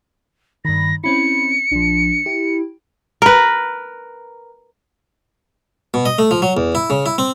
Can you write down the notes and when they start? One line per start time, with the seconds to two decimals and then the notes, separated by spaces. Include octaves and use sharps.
0.65 G2 D#3 B5 A#6
1.04 C4 C#4 E4 B5 C#7
1.71 A#1 F3 D4
2.26 E4 G4
3.22 A#4 B4
5.94 B2
6.06 D#5
6.18 A3
6.31 F3
6.42 F#3
6.57 E2
6.75 E4
6.90 C#3
7.06 E4
7.18 C4